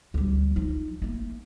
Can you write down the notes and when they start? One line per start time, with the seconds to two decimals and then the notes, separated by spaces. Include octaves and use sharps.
0.14 D2 G3
0.56 F3 D#4
1.02 A3 A#3